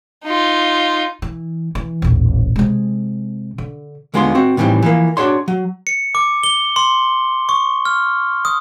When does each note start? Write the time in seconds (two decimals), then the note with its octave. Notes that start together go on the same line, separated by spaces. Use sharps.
0.24 D#4 F4
1.22 E3
1.75 E3
2.02 D#1 A1
2.56 C3 G#3
3.58 D3
4.14 D#2 D3 G#3 B3 F4 C6
4.35 C4 F#4
4.57 A2 D#3 E3 F#3 G3 C4
4.83 E3 F3 A#3
5.17 D4 F#4 G#4 C#5 C6
5.48 F#3
5.87 C#7
6.15 D6
6.43 G7
6.76 C6
7.49 C#6
7.85 F6
8.45 D#6